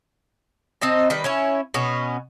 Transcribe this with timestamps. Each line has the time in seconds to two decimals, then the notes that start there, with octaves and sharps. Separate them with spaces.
0.81 C4 D#4 D#5 A5
1.10 D#3 G3 B4
1.24 C#4 E4 C#5
1.74 B2 B3 C#4